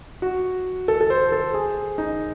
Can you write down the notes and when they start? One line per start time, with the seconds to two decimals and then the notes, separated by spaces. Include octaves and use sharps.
0.22 F#4
0.88 A4
1.01 A4
1.10 C5
1.32 A4
1.54 G#4
1.98 D#4